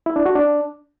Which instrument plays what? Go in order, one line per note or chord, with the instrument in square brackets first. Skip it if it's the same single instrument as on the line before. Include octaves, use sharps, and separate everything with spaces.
[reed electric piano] E4
D4
F#4
D4